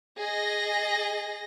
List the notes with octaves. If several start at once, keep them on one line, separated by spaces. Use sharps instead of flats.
G#4 D#5 A#6